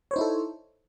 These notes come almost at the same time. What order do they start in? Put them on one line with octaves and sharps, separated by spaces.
C#5 C5 D#4 E4 A4